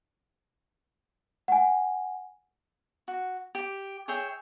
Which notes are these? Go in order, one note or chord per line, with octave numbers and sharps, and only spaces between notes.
F#5 G#5
F#4
G4
G#4 C#5 E5 G5